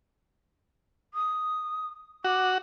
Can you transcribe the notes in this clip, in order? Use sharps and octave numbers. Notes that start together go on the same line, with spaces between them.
D#6
F#4 D6